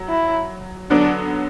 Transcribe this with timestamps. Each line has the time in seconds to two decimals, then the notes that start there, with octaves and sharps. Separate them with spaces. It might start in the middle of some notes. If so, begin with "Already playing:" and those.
Already playing: F#3
0.08 E4
0.90 D3 F#3 B3 D4